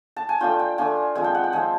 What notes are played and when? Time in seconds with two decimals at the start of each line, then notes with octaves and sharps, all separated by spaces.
0.16 A5
0.29 G#5
0.41 A3 D4 F4 G5
0.59 G5
0.78 A3 D4 F4 G#5
1.15 F3 G#3 C4 G#5
1.24 G5
1.35 F#5
1.44 G5
1.52 F3 G#3 C4 G#5